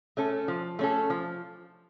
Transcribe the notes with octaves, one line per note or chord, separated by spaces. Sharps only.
A3 C#4 A4
F3
A3 C#4 A4
F3